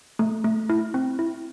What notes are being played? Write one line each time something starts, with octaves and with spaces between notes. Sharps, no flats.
A3
A3
E4
C4
E4